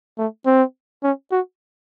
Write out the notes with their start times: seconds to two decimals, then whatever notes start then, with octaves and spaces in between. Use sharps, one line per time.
0.18 A3
0.46 C4
1.03 C#4
1.32 F#4